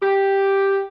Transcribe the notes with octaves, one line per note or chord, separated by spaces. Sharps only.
G4